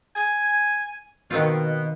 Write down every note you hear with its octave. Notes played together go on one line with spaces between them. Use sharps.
G#5
B2 D#3 C4 F4